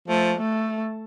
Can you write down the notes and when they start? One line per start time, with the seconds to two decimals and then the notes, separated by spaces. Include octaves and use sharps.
0.08 F3 A3
0.39 A3